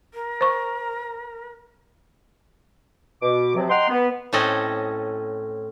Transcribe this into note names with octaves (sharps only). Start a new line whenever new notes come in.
A#4
C5 C#6
B2 D6
C3 F3 F#3
D#5 F#5 G5 A#5 C6
B3
A2 C4 C#4 A4 D#5